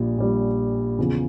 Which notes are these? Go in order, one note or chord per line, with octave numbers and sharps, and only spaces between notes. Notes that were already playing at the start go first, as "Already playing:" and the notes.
Already playing: A#1 A#2 G3
A#1 A#2 G3
E2 C#3 F3